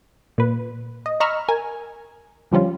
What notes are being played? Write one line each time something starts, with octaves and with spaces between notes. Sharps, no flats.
A#2 B4
D#5
D#5 A#5 B5 C#6 E6 F6
A#4 G#5
D3 F3 G3 C#4 F4